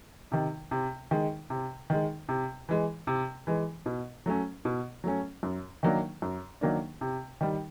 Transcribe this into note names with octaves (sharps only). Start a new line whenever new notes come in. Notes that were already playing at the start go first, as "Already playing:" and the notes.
C3 D#3
C3
D#3 G#3
C3
D#3 G#3
C3
E3 G#3
C3
E3 G#3
B2
F#3 A3 C#4
B2
F#3 A3 C#4
F#2
D#3 F#3 A#3 D4
F#2
D#3 F#3 A#3 D4
C3
D#3 G3